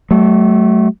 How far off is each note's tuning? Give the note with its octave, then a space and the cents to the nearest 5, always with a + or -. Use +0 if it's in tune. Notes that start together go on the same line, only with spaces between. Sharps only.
F#3 +35 A3 -15